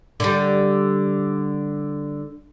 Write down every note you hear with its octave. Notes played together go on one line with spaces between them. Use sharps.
D3 G3